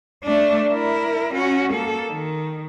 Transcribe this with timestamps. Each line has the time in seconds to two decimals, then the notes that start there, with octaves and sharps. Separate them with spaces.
0.24 A3 D4
0.70 E4 A#4
1.34 C#4 F#4
1.73 A#3 A4
2.07 D#3